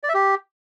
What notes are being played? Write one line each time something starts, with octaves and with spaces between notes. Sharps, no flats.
D5
E5
G4